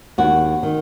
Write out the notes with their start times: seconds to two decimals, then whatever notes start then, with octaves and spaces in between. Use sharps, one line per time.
0.18 D#2 F#4
0.63 D#3